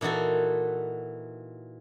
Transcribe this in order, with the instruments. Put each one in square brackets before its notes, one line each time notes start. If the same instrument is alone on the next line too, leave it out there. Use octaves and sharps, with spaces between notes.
[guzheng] A#2 E3 D#4 F#4 A4